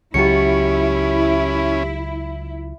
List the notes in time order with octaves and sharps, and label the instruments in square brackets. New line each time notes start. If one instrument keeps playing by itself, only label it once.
[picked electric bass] C#2 F#3 [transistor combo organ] C#4 [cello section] E4 [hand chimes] G4 C#7